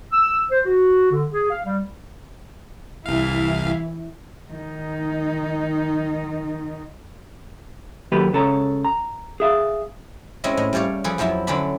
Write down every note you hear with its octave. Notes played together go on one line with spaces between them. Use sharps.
E6
C5
F#4
D3
G#4
F5
G3
C2 E3 E4 F5
D#3 D#4
D#2 F#3 A#3 G4 A4 B4
C#2 C#3 A4 C#5 A#5
A#5
G#4 E5 F5
G#3 C4 C#4 E4 D#5
A2 D#5
G3 A3 C#5 D5 F5
F3 G#4 A4 B4 D5
F2 F3 F#3 E4 A5
D3 F#3 C#4 D4 D5 B5